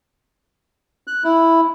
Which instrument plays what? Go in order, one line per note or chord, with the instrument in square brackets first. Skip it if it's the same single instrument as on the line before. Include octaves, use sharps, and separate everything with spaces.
[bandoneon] F#6
E4